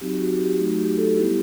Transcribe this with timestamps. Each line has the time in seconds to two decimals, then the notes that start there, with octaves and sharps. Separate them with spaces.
0.01 F#3 C4 D#4 F#4 G4
0.20 F#4
0.39 G4
0.59 F#3 A3 D#4 F#4
0.79 G4
0.98 A4
1.17 G3 B3 E4 G4